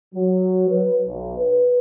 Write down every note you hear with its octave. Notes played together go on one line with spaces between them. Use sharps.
F#3
B4
B1
B4